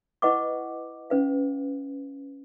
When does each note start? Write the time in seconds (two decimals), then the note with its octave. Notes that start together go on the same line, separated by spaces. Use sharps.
0.22 E4 B4 D#5 F#5 C#6 D6
1.10 C#4 B4 F5